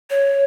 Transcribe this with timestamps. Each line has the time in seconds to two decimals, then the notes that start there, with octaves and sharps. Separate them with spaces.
0.10 C#5